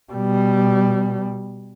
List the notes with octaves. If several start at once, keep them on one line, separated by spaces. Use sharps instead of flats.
B2 G3